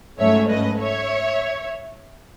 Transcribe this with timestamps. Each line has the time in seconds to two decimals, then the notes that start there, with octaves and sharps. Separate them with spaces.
0.19 G#2 F#3 A3 C#4 C#5 E5
0.49 B4 D#5
0.80 C#5 E5